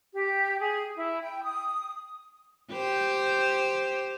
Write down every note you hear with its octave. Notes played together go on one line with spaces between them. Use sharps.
G4
G#4
E4
G5
D#6
G4 C5